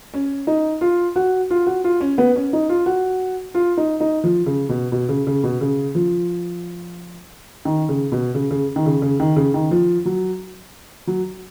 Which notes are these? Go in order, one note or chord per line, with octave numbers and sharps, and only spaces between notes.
C#4
D#4
F4
F#4
F4
F#4
F4
C#4
B3
C#4
D#4
F4
F#4
F4
D#4
D#4
F3
C#3
B2
B2
C#3
C#3
B2
C#3
F3
D#3
C#3
B2
C#3
C#3
D#3
C#3
C#3
D#3
C#3
D#3
F3
F#3
F#3